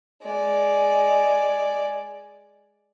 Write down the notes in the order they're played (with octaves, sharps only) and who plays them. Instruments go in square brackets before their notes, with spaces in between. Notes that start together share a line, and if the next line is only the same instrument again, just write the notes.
[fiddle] G#3 D5